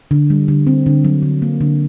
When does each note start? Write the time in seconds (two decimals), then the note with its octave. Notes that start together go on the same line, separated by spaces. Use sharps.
0.11 D3
0.30 G3
0.48 D3
0.67 C4
0.86 D3
1.05 F#3
1.22 D3
1.42 A#3
1.61 D3